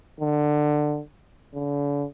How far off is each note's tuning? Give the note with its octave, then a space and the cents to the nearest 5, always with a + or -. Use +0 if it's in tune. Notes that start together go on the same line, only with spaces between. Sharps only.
D3 +20
D3 -40